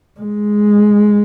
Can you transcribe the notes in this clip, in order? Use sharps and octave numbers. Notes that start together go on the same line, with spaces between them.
G#3